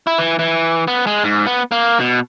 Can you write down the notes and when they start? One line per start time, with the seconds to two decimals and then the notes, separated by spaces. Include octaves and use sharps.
0.07 E4
0.18 E3
0.39 E3
0.88 B3
1.07 G#3
1.24 G#2
1.46 B3
1.72 A#3
2.00 B2